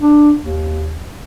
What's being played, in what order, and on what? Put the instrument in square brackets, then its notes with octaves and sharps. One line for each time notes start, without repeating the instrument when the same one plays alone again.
[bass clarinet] D4
D#2